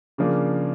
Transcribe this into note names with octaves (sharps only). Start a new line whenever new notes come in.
C#3 F3 A#3 D4